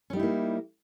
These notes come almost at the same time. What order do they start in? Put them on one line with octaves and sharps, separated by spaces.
C#4 G3 D#4 E4 A#3